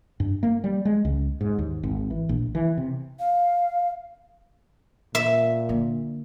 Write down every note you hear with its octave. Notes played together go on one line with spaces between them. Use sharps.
G2
A#3
G3
G#3
C#2
G#2
D#2
G#1
E3
A#1
E3
C3
F5
A#2 E5
D3 A#3